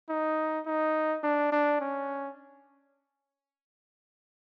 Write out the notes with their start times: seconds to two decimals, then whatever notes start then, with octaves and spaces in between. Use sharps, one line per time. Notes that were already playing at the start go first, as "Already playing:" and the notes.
0.09 D#4
0.67 D#4
1.23 D4
1.52 D4
1.81 C#4